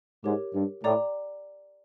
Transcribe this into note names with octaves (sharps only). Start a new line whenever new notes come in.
G#2 G4 A#4 C#5
G2
A2 D5 G5 A#5 D6